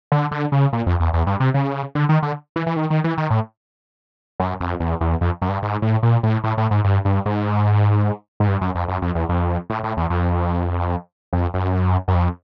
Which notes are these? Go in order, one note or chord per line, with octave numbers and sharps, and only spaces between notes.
D3
D3
C#3
A#2
F2
E2
E2
G2
C3
C#3
D3
D#3
D3
E3
E3
D#3
D#3
E3
D#3
A2
F#2
F2
E2
E2
F2
F#2
G2
G#2
A2
A#2
A2
A2
A2
G#2
G2
G2
G#2
G#2
G2
F#2
F2
F#2
F2
E2
F2
A2
A2
E2
F2
F2
F#2
F#2
F2